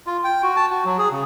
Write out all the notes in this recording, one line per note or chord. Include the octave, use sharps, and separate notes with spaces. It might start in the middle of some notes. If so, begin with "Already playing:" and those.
F4
G5
F#4
A5
F#4
F#3
G#4
C#3